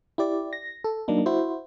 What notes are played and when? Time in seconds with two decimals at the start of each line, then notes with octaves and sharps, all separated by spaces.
0.18 E4 G4 D5
0.53 A#6
0.84 A4
1.08 F#3 A#3 D4 D#4
1.26 E4 F#4 C5